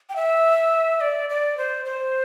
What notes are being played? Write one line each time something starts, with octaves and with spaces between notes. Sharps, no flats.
G5
E5
D5
D5
C5
C5